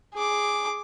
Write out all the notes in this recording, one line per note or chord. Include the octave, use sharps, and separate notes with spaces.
G#4 D6